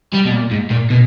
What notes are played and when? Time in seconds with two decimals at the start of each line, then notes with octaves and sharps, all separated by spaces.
0.13 G3
0.26 B2
0.32 A#2
0.51 G#2
0.70 A#2
0.90 B2